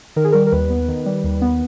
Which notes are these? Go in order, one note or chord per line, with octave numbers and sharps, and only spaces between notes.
D#3 A#4
G#4
G3 A#4
A#4
D#2 B4
B3
D#3
G3
D#2
B3